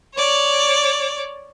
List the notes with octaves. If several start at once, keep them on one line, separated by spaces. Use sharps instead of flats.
C#5 D5